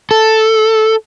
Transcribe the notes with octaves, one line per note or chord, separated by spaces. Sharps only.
A4